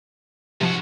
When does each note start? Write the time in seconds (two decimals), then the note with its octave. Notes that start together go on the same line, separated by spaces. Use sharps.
0.61 G#2 C3 F3 F#4